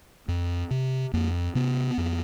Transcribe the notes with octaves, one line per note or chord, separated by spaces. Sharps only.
F2
C3
F2 A#3
C3 B3
F2